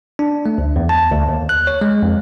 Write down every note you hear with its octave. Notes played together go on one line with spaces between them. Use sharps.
D4
A3
D2
E2
A5
D2
D#2
F#6
C#5
G#3
F2